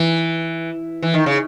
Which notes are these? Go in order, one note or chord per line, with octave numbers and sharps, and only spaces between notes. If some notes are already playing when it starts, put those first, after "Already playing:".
Already playing: E3
E3
D#3
C#3